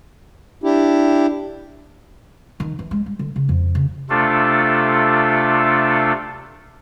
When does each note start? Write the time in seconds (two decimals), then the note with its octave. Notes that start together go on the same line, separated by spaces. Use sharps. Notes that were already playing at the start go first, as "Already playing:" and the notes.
0.64 D4 E4 G4
2.60 D#3
2.79 E3
2.91 G#3
3.06 G3
3.19 D3
3.36 C#3
3.49 F2
3.75 C#3
4.10 C3 A3 D4 F4 A4